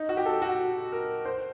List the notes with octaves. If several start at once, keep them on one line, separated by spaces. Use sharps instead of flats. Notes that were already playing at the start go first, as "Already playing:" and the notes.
Already playing: D#4
F#4
G4
A4
F#4
A#4
C5